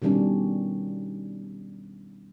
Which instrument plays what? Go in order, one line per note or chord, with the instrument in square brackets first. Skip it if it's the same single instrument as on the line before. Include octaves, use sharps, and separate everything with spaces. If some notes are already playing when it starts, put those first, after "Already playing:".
[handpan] B2 D#3 G3 C#4 D4